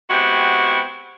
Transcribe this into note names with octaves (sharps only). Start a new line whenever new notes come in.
G#3 B3 C4 E4 F#4 G4